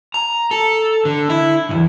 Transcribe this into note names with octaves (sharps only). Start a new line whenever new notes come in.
A#5
A4
D3
E4
B1 E2